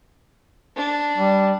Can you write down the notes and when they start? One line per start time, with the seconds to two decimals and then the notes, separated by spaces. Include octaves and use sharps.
0.76 D4
1.18 G3